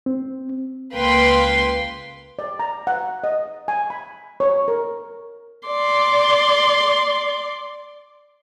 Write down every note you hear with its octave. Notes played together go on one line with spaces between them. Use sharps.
C4
C#2 A#3 B4 F5 G5 C6
D5
A#5
F#5
D#5
G#5
B5
C#5
A#4
D5 C6